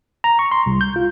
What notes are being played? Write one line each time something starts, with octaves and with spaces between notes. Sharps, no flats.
A#5
C#6
C6
C2
G6
F4